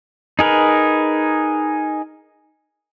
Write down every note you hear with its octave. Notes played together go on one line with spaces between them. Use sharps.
D#4 G#4 A#4 B4